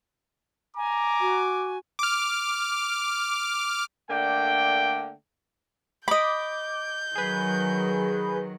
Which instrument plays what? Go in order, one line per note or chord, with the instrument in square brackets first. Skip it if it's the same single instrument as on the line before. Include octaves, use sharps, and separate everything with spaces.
[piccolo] G#5 [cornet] A#5 [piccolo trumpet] D6
[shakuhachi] F#4
[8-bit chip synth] D6 F6
[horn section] D3 A3 A#3 D5 G5
[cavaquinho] D#5 B5 [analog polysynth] D6 [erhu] G6
[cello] D#3 F#3 [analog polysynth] G#4 B4